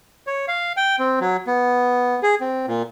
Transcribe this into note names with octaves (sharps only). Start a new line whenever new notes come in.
C#5
F5
G5
C4
F#3
B3
G#4
C4
A#2